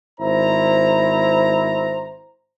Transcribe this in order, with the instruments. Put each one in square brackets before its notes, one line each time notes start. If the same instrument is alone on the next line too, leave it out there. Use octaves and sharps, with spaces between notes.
[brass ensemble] G#1 E4 C5 A#5